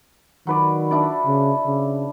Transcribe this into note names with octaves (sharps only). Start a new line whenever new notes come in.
D#3 F#3 B4 D5
D4 E4 D5
C#3
C#3